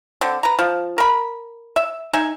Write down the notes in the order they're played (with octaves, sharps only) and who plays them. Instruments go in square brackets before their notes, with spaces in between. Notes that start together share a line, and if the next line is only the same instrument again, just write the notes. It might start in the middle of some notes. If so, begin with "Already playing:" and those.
[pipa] D3 C4
B4 A#5
F3
A#4 B5
E5
D#4 E5 G#5